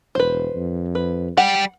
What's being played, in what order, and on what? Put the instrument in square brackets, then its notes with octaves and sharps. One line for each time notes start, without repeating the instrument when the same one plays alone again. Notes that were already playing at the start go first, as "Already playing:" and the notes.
[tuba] E1 [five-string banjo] B4 C5
[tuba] F2
[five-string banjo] B4
[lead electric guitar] G3 G4 [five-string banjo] F#5